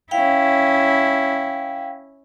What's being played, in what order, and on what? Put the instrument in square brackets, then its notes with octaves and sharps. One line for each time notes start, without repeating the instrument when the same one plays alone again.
[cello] C#4 E4 [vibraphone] F5 G5